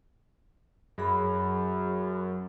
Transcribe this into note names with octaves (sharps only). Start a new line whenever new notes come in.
F#2 F#3 G#4 B5